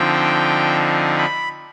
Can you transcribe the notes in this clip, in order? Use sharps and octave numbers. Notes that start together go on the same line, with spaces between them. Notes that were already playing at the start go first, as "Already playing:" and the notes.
Already playing: D3 F3 C4 D#4 G5
B5